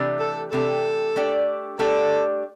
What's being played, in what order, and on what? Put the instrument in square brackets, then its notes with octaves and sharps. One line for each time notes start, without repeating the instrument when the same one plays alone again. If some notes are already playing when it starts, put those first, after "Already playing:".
Already playing: [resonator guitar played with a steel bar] C3 E3 A3 D4 G4
[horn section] A4
[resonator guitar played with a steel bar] C3 E3 A3 D4 G4 [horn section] A4
[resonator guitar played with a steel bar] A3 D4 G4 D5
[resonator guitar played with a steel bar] A3 D4 G4 D5 [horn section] A4